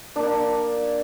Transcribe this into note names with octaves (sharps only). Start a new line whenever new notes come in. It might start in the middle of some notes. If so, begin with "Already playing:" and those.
A#3 D4